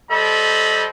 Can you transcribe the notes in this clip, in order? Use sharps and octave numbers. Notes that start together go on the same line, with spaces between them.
G3 A4 C5 D#5 B5